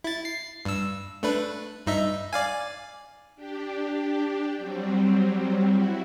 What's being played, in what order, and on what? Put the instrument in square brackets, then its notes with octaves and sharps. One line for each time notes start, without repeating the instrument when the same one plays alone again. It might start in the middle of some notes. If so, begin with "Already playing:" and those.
[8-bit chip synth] E4 A6
C7
G2 E6
A3 D4 B4
G2 D#4 E5
D5 F5 G#5
[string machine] D4 G4
F#3 G3 C4
E4 F#4